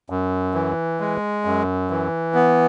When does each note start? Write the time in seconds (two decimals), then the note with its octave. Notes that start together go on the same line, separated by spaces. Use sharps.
0.10 F#2
0.54 E3
1.00 G#3
1.45 F#2
1.90 E3
2.34 B3